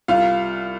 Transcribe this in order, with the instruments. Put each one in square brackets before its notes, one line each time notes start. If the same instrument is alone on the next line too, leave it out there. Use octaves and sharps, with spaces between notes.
[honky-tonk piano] C2 F4 F5